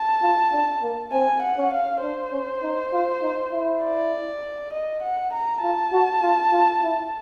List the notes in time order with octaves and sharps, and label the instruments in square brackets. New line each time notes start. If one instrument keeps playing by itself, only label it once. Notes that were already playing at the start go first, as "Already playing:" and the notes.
Already playing: [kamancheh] A5
[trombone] F4
D4
A#3
[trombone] C4 [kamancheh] G#5
[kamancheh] F#5
[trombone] C#4
[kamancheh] F5
[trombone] D4 [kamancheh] C5
[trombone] C#4
D#4
F4
D#4
E4
[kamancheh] D5
D#5
F#5
A#5
[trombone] F4 [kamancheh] A5
[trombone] F#4
F4
F4
E4